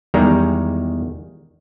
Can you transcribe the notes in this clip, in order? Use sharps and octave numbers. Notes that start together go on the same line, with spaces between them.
E2 D#3 G3 G#3 A#5